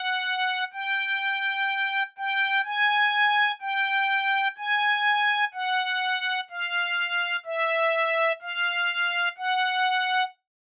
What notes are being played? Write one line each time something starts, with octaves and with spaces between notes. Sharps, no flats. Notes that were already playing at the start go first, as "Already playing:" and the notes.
Already playing: F#5
G5
G5
G#5
G5
G#5
F#5
F5
E5
F5
F#5